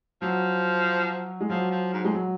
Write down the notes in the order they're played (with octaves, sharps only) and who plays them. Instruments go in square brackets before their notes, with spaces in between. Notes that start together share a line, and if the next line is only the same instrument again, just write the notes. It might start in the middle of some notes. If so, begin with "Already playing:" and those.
[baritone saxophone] F3 [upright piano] F#3
[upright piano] G#3
[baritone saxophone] F3 [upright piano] F#3
[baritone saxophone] F3
G#2
[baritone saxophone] F2 [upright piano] G#3
[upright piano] F#3